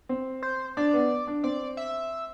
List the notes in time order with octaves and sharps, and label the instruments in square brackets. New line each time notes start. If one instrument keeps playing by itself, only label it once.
[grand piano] C4
[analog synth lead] C5
[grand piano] D4 [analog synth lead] D5
[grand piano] B3
D4
[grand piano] C4 [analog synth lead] D5
[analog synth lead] E5